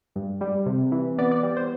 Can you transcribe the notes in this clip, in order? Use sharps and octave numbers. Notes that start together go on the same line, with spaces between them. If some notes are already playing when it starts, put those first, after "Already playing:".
G2
G3
C3
E3
B3 D5
D5
G3
C5